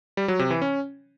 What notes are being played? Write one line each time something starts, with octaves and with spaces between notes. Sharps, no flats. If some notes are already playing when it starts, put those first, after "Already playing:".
G3
F#3
C3
E3
C#4